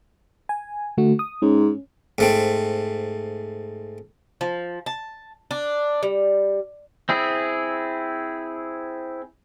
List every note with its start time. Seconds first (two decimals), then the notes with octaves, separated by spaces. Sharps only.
0.49 G#5
0.97 D3 A3 F#4
1.19 D#6
1.42 G#2 C#4
2.18 G#2 A3 C4
4.41 F3
4.86 A5
5.51 D4
6.03 G3
7.09 C4 E4 G#4